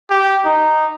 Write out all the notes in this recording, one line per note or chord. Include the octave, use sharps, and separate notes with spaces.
G4
D#4